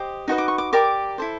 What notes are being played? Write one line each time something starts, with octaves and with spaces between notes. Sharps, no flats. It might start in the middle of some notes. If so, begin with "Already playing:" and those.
Already playing: G4 C5 D#5
D#4 F#4 B4 D#5
D6
C#6
D6
G4 A#4 D5 D6
E4 A4 C5